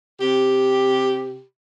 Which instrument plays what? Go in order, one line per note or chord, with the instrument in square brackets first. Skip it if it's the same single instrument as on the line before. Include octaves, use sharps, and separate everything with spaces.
[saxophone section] C3 G4